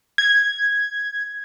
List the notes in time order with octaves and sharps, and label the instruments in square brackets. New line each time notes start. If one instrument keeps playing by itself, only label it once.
[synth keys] G#6